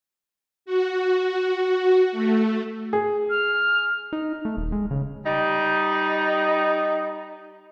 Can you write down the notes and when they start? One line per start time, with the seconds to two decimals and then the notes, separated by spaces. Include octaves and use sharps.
0.66 F#4
2.12 A3
2.93 G#4
3.30 F6
4.13 D#4
4.45 A3
4.57 D#1
4.72 G#3
4.91 C#3
5.26 G3 D#4